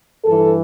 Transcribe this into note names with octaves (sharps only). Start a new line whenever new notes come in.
G2 E3 A4